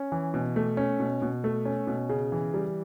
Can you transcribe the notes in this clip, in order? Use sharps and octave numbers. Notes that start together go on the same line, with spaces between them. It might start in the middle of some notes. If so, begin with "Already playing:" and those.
Already playing: C#4
E3
B2
A3
C#4
B2
B2
A3
C#4
B2
C#3
E3
G3